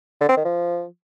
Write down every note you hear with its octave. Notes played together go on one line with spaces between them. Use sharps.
D3
C4
D#3
F3